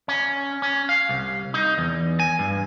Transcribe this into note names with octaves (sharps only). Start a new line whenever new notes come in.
C#4
C#4
F5
C2
D#4
E2
G#5
G2